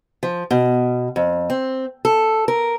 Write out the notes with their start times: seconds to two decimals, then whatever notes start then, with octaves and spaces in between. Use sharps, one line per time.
0.23 F3
0.51 B2
1.16 F2
1.50 C4
2.05 A4
2.48 A#4